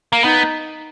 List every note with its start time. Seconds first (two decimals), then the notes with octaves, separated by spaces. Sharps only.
0.13 A#3
0.24 B3 D#4